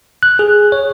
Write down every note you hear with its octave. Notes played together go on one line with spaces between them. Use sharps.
F#6
G#4
C#5